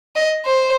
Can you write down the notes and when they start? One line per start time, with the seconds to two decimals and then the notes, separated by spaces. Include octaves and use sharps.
0.15 D#5
0.45 C5